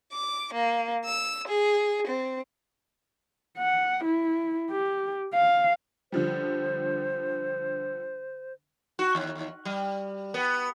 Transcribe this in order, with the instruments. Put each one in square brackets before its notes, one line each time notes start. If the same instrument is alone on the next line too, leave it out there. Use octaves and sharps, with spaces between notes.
[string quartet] D6
A#3
E6
G#4
C4
[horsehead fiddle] F#5
E4
G4
F5
[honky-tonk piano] D3 F3 G3 [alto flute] C5
[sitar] F#4
D#2
G3
B3